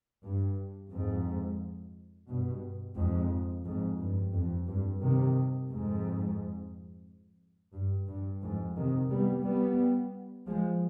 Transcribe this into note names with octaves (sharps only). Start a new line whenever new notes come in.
G2
F2 G#2
G2 B2
F2 G#2
F2 G#2
G2
F2
G2
C3 D#3
F2 G#2
G2
G2
F2 G#2
C3 D#3
G3 B3
G3 B3
F3 G#3